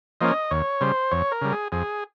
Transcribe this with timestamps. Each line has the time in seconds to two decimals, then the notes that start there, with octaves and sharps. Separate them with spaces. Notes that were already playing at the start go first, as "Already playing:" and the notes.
0.21 F3 A#3 C#4 D#5
0.51 D#2 C#5
0.81 C#3 G3 C5
1.11 F2 C#5
1.32 A#4
1.42 C#3 G3
1.52 G#4
1.72 F2 G#4